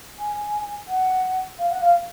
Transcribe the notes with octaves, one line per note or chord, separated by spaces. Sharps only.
G#5
F#5
F5
F#5
F5